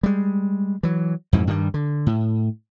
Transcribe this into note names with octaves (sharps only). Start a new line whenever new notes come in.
G3 G#3
E3 F#3
F2 G#2 B2 E3
G2 D#3 F3 G3
D3
A2